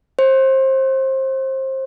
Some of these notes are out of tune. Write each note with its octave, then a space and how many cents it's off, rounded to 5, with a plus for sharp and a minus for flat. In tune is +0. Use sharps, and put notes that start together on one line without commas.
C5 +25